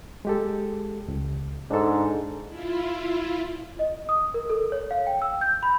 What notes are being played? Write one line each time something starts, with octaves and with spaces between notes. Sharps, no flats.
G#3 G4 A4
C#2
G#2 D4 A4
E4 F4
D#5
D#6
A#4
A4
C#5
F5
G5
E6
G6
B5